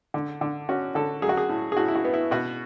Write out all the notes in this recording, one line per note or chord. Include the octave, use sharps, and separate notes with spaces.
D3
D3
C#4 F#4
D3 A4
F#3 G#4
F#4
G#4
A2
G#4
A2 F#4
E4
F#4
B3
E4
B2 F#4